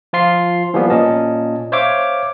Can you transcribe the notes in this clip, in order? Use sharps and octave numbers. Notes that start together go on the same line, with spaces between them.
F3 F4 C6 C7
E3 F3 G3 A#3 B3
A#2 C#4 D#5 A5
C5 C#5 E5 F5 D6